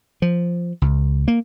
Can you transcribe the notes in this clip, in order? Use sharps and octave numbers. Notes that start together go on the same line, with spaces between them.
F3
C#2
A#3